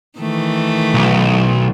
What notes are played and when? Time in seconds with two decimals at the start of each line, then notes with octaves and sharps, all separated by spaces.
0.19 D#3 E3 A3
0.94 B1